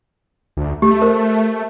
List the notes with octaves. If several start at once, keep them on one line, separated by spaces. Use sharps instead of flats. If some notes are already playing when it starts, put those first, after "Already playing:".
D2
A3 G4
A#4 C5